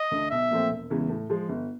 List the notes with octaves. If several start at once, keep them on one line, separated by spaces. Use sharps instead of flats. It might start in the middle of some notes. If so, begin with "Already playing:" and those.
Already playing: D#5
D2 D3
B1 E5
A#2 F3 A3 C4
E1
E2 C#3 E3 G#3
A2
F3 G#3
G1